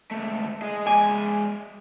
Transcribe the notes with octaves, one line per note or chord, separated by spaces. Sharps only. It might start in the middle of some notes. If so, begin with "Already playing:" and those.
C#2 A3
G#4 D#5
G#3 D5 G#5